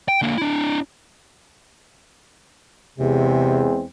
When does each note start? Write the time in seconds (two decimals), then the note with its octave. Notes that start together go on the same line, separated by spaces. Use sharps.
0.08 G5
0.22 D3 A#3
0.38 D4 E4
2.98 E2 C3 G#3 C4